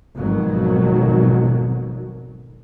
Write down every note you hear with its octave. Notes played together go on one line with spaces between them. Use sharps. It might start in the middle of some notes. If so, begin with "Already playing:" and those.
G#1 F2 B2 D#3 F#3